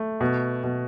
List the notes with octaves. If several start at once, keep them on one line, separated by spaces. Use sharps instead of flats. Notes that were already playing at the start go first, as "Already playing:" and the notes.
Already playing: A3
B2
B2